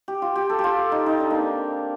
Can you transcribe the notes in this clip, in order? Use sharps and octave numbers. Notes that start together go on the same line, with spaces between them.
G4
F4
G4
A4
G4
F4
D#4
D#4
D4
A#3 C4